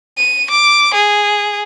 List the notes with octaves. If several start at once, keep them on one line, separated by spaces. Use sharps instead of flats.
D#7
D6
G#4